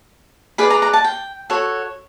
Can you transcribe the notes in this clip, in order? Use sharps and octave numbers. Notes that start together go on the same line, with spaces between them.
G#4 B4 D5 B5
A#5
A#5
A5
G5
F#4 A4 C#5